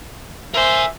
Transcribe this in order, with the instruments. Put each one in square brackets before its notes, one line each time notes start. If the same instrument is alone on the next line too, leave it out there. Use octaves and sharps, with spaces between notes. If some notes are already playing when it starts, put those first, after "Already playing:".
[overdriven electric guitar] A#4 G#5 [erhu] C5 [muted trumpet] E5